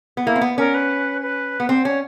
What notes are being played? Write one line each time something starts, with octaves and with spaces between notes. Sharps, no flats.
B3
A#3 E4
C4
B3
C#4 A#4
B4
B4
B3
C4 C5
C#4 C#5